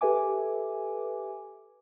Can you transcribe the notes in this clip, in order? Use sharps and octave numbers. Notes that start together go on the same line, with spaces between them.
G4 A4 B4 E5 G#5 D6